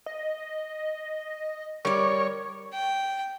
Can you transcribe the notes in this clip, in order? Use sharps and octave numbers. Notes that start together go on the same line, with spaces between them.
D#5
G3 A#4 C#5 D5
G5